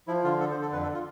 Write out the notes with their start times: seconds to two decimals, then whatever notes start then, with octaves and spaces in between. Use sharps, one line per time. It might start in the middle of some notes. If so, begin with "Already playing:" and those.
0.08 F3 E4
0.24 D3 F4
0.39 D3 A4
0.51 C5
0.56 D3
0.62 A4
0.72 F2 B4
0.83 A4
0.94 F4